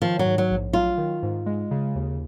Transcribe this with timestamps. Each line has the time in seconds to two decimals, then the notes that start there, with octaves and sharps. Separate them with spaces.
0.02 D#3 F3
0.19 F#3
0.25 G#2
0.38 F#3
0.50 A#1
0.73 F#3 F4
0.98 D#3
1.23 G#2
1.46 G#3
1.71 C#3
1.95 D#2